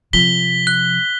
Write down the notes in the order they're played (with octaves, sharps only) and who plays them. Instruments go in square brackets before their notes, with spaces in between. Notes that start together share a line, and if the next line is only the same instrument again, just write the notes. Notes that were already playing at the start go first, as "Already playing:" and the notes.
[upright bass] C3 F3 [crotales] B6 G7
[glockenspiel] F#6